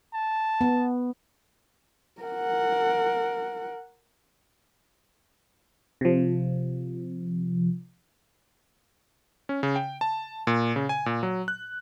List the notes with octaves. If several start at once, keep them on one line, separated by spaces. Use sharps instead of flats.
A5
B3
A#4 F#5
C3 F3
C#4
C#3
G5
A5
A#2
C#3
G#5
A#2
F#3
F#6